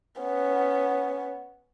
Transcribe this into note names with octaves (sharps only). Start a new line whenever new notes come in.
B3 C#4